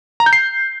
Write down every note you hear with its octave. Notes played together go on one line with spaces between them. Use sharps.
A#5
G6
C7